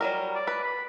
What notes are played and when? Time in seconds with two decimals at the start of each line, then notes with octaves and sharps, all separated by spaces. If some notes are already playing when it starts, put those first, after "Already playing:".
0.01 F#3 G3 A#4
0.35 D5
0.47 B4
0.64 B5